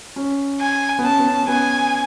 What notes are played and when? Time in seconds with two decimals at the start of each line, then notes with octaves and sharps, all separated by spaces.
0.16 C#4
0.61 G#5
0.99 B3
1.03 C#4 A5
1.19 B3
1.26 C#4
1.43 C#4
1.48 B3 G#5